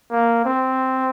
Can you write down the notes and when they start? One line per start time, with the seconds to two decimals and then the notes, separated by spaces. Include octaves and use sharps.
0.11 A#3
0.45 C4